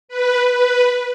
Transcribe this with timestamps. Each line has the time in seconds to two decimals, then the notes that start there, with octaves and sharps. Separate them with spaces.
0.09 B4
0.51 B4